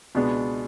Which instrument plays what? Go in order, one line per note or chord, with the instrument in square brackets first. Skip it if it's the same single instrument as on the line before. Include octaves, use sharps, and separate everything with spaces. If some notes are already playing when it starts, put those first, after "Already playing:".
[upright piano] C#2 B2 G#3 B3 D4